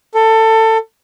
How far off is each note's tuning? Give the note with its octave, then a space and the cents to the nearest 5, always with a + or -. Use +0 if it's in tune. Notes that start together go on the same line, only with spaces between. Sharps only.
A4 +20